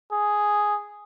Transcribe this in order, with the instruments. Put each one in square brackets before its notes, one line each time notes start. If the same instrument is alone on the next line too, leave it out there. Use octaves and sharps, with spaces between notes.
[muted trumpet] G#4